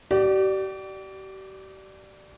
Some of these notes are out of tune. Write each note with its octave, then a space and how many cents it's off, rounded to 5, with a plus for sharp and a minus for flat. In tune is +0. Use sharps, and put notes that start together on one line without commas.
G4 -40 D5 +10